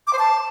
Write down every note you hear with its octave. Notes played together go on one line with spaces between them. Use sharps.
D6
C5
A5